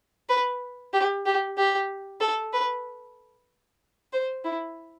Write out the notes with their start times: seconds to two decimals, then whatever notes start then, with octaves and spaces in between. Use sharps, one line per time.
0.29 B4
0.93 G4
1.26 G4
1.57 G4
2.21 A4
2.53 B4
4.13 C5
4.45 E4